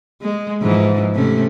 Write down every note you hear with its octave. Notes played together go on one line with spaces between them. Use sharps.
G#3
G#2 E3 F3
C3 A3 C#4